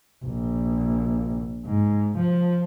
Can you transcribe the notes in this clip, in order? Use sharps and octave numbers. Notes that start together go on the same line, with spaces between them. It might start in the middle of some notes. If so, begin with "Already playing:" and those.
A#1
G#2
F3